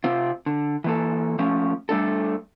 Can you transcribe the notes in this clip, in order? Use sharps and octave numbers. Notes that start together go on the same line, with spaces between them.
C3 C4 F4
D3
E3 A#3 A4
F3 A3 C#4
G3 A3 D4 A4